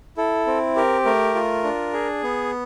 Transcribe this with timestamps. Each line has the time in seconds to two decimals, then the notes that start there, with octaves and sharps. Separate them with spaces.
0.17 E4 A4
0.46 C4
0.76 G4 A#4
1.05 A3 A#4
1.35 F4
1.64 D4
1.93 G#4
2.23 B3